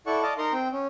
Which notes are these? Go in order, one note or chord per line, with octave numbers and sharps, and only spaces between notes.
E4 A4 D5 F#5 C#6
D5 D#5 F5 A5 D6
D#4 A#4 A#5 C6
C4 G5
C#4